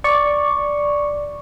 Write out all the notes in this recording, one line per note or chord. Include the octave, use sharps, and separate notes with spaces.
D5 C#6